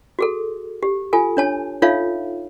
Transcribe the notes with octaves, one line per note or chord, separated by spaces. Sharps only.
F#4 G#4 A4
G4
F4 A4 G#5
D4 C#5 A5
D#4 F4 A4 C#5 E5 F5